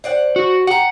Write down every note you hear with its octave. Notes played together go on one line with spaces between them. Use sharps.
C5 D5 F#5
F#4
G4 F#5 A#5